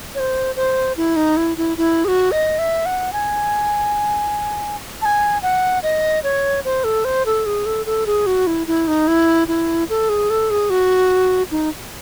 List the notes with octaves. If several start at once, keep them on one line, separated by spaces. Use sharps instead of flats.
C#5
C5
C5
E4
D#4
E4
E4
E4
G#4
F#4
D#5
E5
F#5
G#5
A5
G#5
F#5
D#5
C#5
C5
A4
C5
A4
G#4
A4
A4
G#4
F#4
E4
E4
D#4
E4
E4
A4
G#4
A4
G#4
F#4
D#4